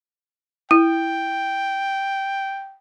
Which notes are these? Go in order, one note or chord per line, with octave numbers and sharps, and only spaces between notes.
E4 G5